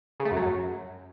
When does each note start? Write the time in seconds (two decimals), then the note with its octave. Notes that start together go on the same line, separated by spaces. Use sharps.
0.20 C#3
0.25 A3
0.31 F#2
0.37 F#3
0.42 F#2